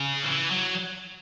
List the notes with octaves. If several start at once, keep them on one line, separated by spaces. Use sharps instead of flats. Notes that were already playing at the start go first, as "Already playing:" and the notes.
Already playing: C#3
E3
F#3